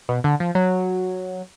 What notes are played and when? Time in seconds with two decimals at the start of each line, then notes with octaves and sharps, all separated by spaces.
0.09 B2
0.24 D3
0.40 F3
0.55 F#3